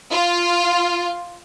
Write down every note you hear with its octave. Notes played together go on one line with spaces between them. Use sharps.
F4